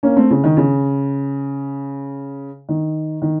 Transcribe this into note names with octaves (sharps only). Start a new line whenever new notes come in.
A#3 C#4
A3 C4
C#3
D#3
C#3
D#3
D#3